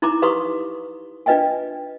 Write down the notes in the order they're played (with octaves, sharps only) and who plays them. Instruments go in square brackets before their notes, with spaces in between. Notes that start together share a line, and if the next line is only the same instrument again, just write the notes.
[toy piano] D#4 E4 A#5 B5 D6
G4 B4 F5 C6 C#6 D#6
D4 F4 B4 D#5 G5 G#5